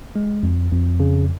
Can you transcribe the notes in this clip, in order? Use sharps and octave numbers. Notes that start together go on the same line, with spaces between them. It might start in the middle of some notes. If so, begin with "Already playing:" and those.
G#3
F2
F2
C#3